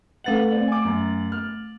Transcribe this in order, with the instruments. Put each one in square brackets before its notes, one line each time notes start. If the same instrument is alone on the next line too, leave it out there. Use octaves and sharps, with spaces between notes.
[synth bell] A3 A6 F#7 [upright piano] A4 B4 F#5
[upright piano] C4 D5
G#5 D6
F#2
F6